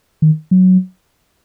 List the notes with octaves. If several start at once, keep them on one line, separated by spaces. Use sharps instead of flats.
D#3
F#3